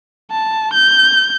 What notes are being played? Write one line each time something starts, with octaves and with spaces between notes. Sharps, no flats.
A5
G6